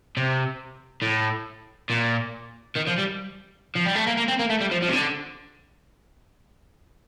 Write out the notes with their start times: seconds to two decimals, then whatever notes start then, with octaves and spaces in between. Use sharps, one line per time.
0.17 C3
1.02 A2
1.90 A#2
2.76 D#3
2.88 F3
2.98 G3
3.76 F3
3.86 G3
3.96 A3
4.07 A#3
4.18 A#3
4.28 C4
4.40 A#3
4.50 A3
4.61 G3
4.72 F3
4.83 F3
4.89 C3
4.93 D3